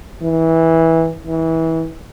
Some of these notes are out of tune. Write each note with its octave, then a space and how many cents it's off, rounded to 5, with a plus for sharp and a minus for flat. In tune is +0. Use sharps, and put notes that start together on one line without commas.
E3 -15
E3 -25